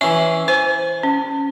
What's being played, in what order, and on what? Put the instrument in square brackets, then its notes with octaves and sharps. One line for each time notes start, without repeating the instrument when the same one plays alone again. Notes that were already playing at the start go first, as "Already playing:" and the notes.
[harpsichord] E3 C#4 [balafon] E5
[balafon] C5 [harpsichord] G#5
[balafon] C#4